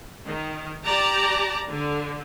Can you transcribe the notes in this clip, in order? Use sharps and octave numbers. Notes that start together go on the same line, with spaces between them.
D#3
G4 D5 A5 A#5
D3